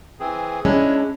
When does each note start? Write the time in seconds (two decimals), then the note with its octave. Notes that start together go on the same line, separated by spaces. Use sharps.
0.20 E3 C4 G#4
0.65 G#3 C#4 D4 E4